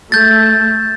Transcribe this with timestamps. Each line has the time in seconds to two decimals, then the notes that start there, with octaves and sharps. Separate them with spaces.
0.12 A3 G6 A6